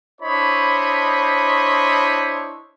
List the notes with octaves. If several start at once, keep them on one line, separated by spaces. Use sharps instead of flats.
D4 E4 C5 C#5 D#5 B5